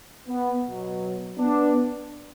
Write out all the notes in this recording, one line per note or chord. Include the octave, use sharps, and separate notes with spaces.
B3
B2 F#3
B3 D4